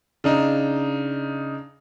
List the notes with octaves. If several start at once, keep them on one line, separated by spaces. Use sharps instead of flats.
C#3 D4 D#4